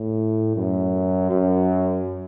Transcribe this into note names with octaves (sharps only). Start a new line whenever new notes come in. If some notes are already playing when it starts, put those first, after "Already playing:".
Already playing: A2
F#2
F#2